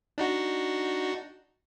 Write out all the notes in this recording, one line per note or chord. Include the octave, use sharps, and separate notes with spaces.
D4 D#4 F#4